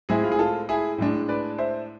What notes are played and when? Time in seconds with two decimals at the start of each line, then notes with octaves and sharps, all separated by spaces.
0.09 A2 G#3 C4 E4 G#4
0.24 F4
0.32 G#4
0.39 F4 A4
0.69 E4 G#4
0.98 A2 G#3 D4
1.29 B4 D5
1.58 C5 E5